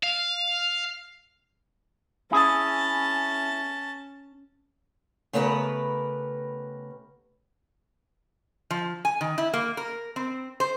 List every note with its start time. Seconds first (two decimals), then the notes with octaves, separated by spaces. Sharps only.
0.03 F5
2.32 C#4 E4 G#4 A5
5.33 C#3 A3 B3 G4 A#4 B4
8.71 F3
9.05 G#5
9.21 D#3
9.38 E4
9.54 A#3
9.77 A#4
10.16 C4
10.60 C5